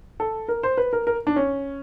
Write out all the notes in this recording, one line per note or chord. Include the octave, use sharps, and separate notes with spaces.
A4
A#4
C5
B4
A#4
A#4
D4
C#4